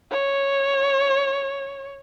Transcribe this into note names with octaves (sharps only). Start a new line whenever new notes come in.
C#5